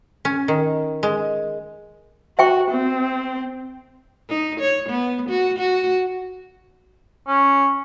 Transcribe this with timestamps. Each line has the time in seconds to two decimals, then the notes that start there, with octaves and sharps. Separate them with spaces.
0.25 C#4
0.48 D#3
1.03 G#3
2.39 F#4 E5 G5 C#6
2.71 C4
4.29 D#4
4.60 C#5
4.89 B3
5.29 F#4
5.59 F#4
7.28 C#4